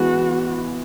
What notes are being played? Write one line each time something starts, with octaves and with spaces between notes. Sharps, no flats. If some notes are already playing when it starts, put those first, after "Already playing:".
Already playing: E3 G#3 B3 F#4